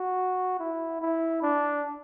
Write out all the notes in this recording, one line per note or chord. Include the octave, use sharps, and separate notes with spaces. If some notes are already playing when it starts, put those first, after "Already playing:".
Already playing: F#4
E4
E4
D4